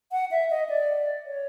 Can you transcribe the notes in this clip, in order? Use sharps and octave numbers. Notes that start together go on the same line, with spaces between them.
F#5
E5
D#5
D5
C#5